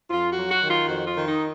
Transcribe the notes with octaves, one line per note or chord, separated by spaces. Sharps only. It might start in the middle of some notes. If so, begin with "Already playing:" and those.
F2 F4
F#4
F#3
F#4
D#3
F4
F2 F#4
F4
D#3
D#4